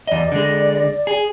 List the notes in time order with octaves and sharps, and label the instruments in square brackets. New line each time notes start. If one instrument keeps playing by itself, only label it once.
[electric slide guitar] E2 D#5 [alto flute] D5
[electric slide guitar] D3 G#3
G#4